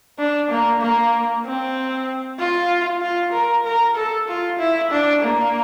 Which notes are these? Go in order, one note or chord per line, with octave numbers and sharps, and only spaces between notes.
D4
A#3
A#3
C4
F4
F4
A#4
A#4
A4
F4
E4
D4
A#3